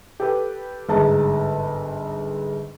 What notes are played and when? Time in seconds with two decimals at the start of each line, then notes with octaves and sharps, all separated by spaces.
0.20 G4 A4 B4
0.89 G1 G#2 G#3 A5 A#5